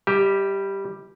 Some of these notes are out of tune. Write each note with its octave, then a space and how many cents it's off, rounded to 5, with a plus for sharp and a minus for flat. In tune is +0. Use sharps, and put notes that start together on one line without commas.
G3 +0 G4 +0 E5 -45